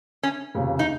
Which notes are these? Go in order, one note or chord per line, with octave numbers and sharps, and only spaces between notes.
C#4
F1 D#2 C#3
D#4